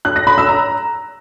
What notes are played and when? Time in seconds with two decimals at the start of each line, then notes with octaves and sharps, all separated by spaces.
0.05 F#6
0.16 A#6
0.27 B5
0.38 E6
0.49 A#5